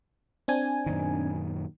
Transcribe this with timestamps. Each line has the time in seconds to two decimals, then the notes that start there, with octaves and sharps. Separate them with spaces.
0.48 C4 D4 G#5
0.86 F#2 A#2 D#3